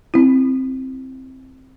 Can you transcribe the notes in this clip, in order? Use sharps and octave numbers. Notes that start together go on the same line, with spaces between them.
C4 E4